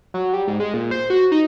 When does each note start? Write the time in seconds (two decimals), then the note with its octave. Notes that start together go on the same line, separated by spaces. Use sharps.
0.14 F#3
0.34 G3
0.48 G#2
0.60 G#3
0.74 A#2
0.91 C5
1.10 F#4
1.32 D#4